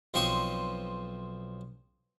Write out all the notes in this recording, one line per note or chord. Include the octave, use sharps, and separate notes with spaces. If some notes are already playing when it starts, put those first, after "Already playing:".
B1 F3 C4 C6 C#6 D#6